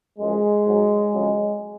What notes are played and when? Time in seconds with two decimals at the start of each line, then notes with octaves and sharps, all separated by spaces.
0.18 F#2 F3 G#3
0.65 G#2 F#3
1.12 F2 C#3 F#3